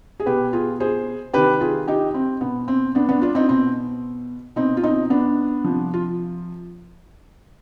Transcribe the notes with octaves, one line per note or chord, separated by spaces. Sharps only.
G#4
B2 G4 B4
F4 G#4
G#4 C5
C3 D#3 G4 B4
F4 G#4
D#4 G4
C4
B2 B3
C4
B3 D4
B3 D4
D4 F4
C4 D#4
B2 C4
B2 C4 D#4
F4
C4 D#4
B3 D4
C3 F3
F4